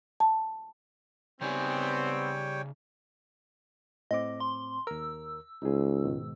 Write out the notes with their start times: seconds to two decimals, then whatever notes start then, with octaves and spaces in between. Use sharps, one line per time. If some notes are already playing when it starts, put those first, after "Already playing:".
0.20 A5
1.41 C#3 G3 B3 C4 D#4 C#5 G5 G#5
4.11 A2 C4 D#5 D6
4.40 C6
4.87 D#2 A#4 E6
5.63 C#2 D#4 G#4
6.04 G#2 B2 D#3